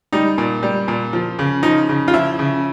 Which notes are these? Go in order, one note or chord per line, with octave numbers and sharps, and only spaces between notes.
G3 D#4
A#2
G3
A#2
F3
C#3
F3 D#4
C#3
F4
F3 E4
C#3